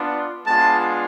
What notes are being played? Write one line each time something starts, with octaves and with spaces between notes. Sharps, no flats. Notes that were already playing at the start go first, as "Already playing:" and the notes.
Already playing: B3 D4 F4
G#3 B3 D4 F4 A5